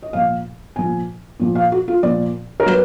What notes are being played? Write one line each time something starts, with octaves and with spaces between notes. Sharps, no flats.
D#5
A#2 F3 F5
A#2 F3 G#5
A#2 F3
F5
F#4
F4
A#2 F3 D5
A#4
F#3 B4